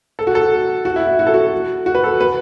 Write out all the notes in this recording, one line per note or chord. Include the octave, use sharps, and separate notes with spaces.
A4
F#4
A4
F#4
E4
E4
F#4
A4
F#4
F#4
B4
A4
B4